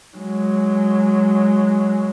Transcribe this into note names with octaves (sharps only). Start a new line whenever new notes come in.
F#3 G#3